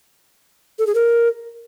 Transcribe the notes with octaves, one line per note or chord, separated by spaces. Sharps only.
A4
G#4
A#4